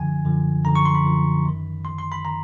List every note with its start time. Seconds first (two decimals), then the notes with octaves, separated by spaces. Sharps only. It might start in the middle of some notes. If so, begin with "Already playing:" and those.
Already playing: F#2 D3 F3 G#5
0.25 F#2 D3 F3
0.65 F#2 D3 F3 A#5
0.75 C#6
0.85 C6
0.95 B5
1.04 F#2 D3 F3
1.45 F#2 D#3
1.85 F#2 D#3 C6
1.98 C6
2.12 B5
2.25 D#3 A#5